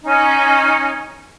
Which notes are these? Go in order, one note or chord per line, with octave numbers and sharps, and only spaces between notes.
C#4 D#4